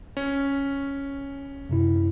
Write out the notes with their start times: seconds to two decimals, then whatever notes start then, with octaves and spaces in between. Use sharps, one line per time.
0.17 C#4
1.69 F#2 C3 E4